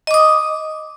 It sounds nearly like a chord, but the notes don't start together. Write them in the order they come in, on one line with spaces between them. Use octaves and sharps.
D#5 D6 D#6